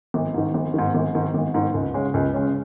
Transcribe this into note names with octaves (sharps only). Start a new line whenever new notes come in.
G#1
G#2 D#3
G#1
G#2 D#3
G#1
G#2 D#3
G#1
G#2 D#3
C#2
C#3 G#3 C#4
C#2
C#3 G#3 C#4